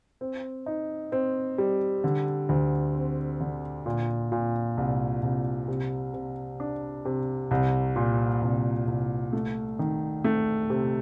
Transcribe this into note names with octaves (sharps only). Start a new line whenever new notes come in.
C4
D#4
C4
G3
D3
D2
C4
D3
A#2
A#2
C2
C2
C3
C3
D4
C3
C2
A#2
C2
C2
A3
D#3
A3
C3